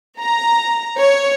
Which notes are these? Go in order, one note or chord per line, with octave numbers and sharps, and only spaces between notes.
A#5
C#5